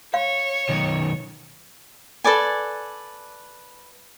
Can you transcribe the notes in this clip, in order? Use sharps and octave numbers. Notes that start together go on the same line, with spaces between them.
C#5 F5
B1 D#3
A4 B4 D5 G#5